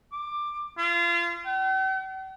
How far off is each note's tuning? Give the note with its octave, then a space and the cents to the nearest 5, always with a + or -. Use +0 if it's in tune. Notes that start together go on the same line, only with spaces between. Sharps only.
D6 +15
F4 -30
G5 -45